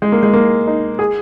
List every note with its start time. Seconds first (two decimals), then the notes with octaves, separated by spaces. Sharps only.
0.02 G#3
0.12 A#3
0.23 G#3
0.33 A#3
0.67 D#4
0.99 G#4